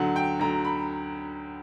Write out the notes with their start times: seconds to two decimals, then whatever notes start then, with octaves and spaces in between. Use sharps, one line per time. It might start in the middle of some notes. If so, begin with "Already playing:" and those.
Already playing: D2 D3 F#3 F#5
0.16 G5
0.39 D2 D3 F#3 A#5
0.65 B5